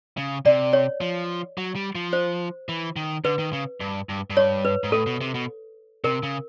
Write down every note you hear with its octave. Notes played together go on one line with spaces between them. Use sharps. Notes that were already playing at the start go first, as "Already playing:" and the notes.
C#3
C3 D5
C#5
F3
F#3
G3
F3
C5
E3
D#3
D3 B4
D#3
C#3
G2
G2
G2
C#5
B4
G#2
A2 A4
B2
C3
B2
C3 A#4
C#3